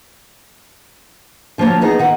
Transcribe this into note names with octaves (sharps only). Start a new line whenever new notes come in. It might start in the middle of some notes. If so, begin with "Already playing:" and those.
D3 F3 F#3 A#3 C#5
B3 D#4 G#4
D#3 F#5